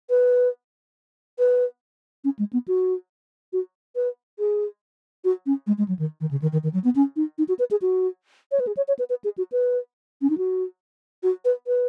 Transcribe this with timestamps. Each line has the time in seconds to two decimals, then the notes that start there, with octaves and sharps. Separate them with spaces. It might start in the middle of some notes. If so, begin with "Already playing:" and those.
0.10 B4
1.39 B4
2.24 C#4
2.39 G#3
2.53 B3
2.68 F#4
3.53 F#4
3.96 B4
4.39 G#4
5.24 F#4
5.46 C#4
5.67 G#3
5.78 G#3
5.88 F#3
5.99 D#3
6.21 D#3
6.31 C#3
6.42 D#3
6.52 D#3
6.63 D#3
6.73 F#3
6.84 B3
6.95 C#4
7.16 D#4
7.38 D#4
7.48 F#4
7.59 B4
7.71 G#4
7.82 F#4
8.52 C#5
8.60 B4
8.67 G#4
8.77 C#5
8.88 C#5
8.99 B4
9.10 B4
9.24 G#4
9.38 F#4
9.52 B4
10.22 C#4
10.30 D#4
10.38 F#4
11.23 F#4
11.45 B4
11.67 B4